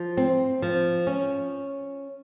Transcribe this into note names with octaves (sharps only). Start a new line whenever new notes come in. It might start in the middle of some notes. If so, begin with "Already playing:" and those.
Already playing: F3
C4
F3
C#4